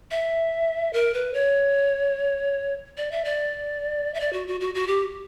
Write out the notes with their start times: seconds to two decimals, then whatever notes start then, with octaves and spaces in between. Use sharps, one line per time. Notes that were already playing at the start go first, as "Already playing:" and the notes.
0.11 E5
0.93 A#4
1.14 B4
1.34 C#5
2.97 D5
3.11 E5
3.25 D5
4.14 E5
4.20 D5
4.33 F#4
4.48 F#4
4.61 F#4
4.75 F#4
4.87 G4